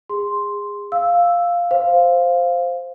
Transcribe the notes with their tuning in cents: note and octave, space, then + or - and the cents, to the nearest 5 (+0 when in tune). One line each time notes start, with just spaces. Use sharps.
G#4 -30 C6 +0
F5 +0 E6 +0
C5 +0 F5 +0